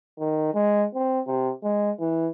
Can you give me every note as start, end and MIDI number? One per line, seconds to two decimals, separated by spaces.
0.19 0.50 51
0.54 0.85 56
0.95 1.20 60
1.27 1.51 48
1.63 1.91 56
2.00 2.30 52